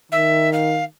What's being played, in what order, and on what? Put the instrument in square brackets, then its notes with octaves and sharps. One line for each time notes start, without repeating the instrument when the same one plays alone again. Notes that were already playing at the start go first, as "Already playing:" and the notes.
[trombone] D#3 [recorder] E5
[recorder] F5